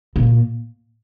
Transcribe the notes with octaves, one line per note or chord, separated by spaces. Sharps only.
A#2